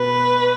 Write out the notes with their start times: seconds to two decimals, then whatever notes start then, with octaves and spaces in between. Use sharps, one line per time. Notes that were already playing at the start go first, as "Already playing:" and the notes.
Already playing: B2 B4